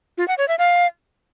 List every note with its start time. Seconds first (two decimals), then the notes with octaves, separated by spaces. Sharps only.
0.18 F4
0.28 F#5
0.38 C#5
0.48 E5
0.58 F5